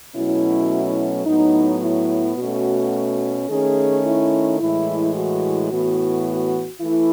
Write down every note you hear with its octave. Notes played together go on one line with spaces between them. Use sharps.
B2 F#3 A3 C#4 E4
A2 F#3 B3 D#4
E4
B2 A3 C#4 F#4
D#3 A3 C#4 G#4
E4
A2 E3 G#3 E4
F#4
A2 E3 B3 F#4
E3 A3 E4